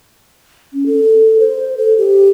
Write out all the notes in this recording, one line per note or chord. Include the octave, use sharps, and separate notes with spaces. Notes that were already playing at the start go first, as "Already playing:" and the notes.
C#4
A4
C5
A4
G4